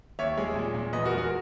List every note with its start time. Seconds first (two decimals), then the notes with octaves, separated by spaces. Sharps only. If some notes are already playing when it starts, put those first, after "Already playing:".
0.19 D#2 C#5 E5
0.38 G#3
0.55 A#2
0.74 A#2
0.93 E2 B4 D#5
1.05 F#4 A#4
1.12 G#3
1.18 F#4 A#4